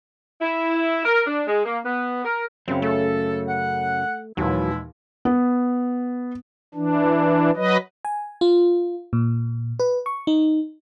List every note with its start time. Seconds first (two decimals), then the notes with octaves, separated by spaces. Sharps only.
0.42 E4
1.05 A#4
1.27 D4
1.47 G#3
1.64 A#3
1.86 B3
2.25 A#4
2.68 F#2 C#3 C4
2.82 A3 A4
3.48 F#5
4.37 D#2 A#2 E3 F#3 G#3 E4
5.25 B3
6.74 E3 D4
7.56 F#3 B4 D#5
8.05 G#5
8.41 F4
9.13 A#2
9.80 B4
10.06 C#6
10.27 D#4